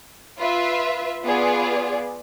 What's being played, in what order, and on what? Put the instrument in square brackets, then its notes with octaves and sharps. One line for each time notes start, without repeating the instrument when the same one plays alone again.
[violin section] F4 B4 E5
B3 F4 G#4 D5